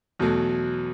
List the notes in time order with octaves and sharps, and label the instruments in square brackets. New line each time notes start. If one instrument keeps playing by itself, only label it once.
[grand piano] E2 B2 F#3 A3